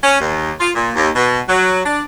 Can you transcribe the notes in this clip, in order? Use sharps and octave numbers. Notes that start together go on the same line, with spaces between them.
C#4
D#2
F4
A#2
D#2
B2
F#3
D4